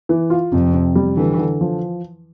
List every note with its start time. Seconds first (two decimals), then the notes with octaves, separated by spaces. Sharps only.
0.09 E3
0.30 F4
0.52 F2 C3
0.74 C3
0.95 G3
1.16 D3 E3
1.39 D3
1.61 F3